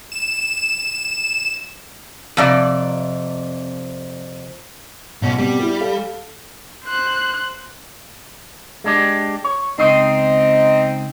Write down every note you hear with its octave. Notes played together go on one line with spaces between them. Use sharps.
E7
F2 C3 D5
B1 B2 C#4
B2 G3 C4
E4 G4
A4 F5
C5 F#6
G#3 D4 G4
C#5
C#2 C4 D#4 C5 D#5